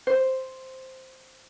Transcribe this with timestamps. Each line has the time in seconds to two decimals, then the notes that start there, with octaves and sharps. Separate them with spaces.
0.07 C5